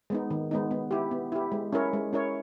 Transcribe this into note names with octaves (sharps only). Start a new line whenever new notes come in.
G#3 B3 D#4
D#3
G#3 B3 D#4
B3
E4 G4
B3
E4 G4
G#3
C#4 E4 A#4 C#5
G#3
C#4 E4 A#4 C#5